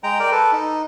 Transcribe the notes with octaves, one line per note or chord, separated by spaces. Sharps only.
G#3 G5 A#5
A#4 D5 G5
A4 B4
D#4